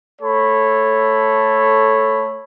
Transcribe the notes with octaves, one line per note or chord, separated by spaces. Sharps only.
A3 A4 C#5 B5